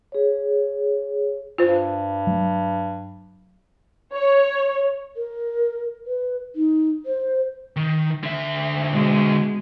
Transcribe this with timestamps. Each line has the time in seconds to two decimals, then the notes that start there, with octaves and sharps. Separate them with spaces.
0.12 G#4 C#5
1.58 G2 F4 C5
2.27 F#3 A3
4.14 C#5
5.17 A#4
6.07 B4
6.56 D#4
7.06 C5
7.76 D#3
8.23 D3 E5
8.90 B2 G#3